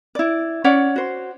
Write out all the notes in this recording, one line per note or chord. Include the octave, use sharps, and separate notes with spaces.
E4 D5
C#4 C#5 D5 F#5
F#4 C5